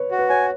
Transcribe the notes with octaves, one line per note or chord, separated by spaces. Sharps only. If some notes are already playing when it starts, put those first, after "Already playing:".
Already playing: B4 C#5
F#4
B4
C#5 G#5